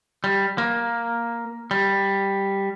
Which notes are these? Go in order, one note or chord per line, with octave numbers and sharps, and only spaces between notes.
G3
A#3
G3